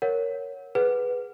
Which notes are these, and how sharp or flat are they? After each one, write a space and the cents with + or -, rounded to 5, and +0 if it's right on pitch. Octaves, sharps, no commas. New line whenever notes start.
A#4 +0 C#5 +0 F#5 -10
G#4 +0 B4 +0 F#5 +0